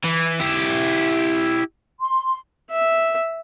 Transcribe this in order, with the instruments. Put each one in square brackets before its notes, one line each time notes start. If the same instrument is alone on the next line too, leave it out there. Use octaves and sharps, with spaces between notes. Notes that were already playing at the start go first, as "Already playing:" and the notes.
[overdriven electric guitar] E3
E4 G4
[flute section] C6
[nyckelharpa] E5